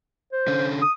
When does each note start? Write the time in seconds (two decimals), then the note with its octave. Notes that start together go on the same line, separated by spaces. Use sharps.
0.32 C5
0.48 D3 C#4
0.82 D#6